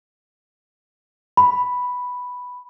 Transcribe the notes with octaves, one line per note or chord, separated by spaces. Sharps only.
B5